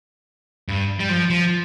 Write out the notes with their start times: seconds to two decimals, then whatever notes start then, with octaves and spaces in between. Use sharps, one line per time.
0.68 G2
1.00 G3
1.09 F3
1.30 F3